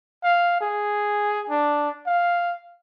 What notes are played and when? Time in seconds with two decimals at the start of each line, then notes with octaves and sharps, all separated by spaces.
0.24 F5
0.61 G#4
1.49 D4
2.07 F5